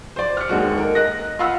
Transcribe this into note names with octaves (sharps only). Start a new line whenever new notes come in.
C5 D5
F6 C#7
D#2 G#3 F#4
A#4
D#5 F#6 A#6
F4 F5 F#5 B5 E6 F6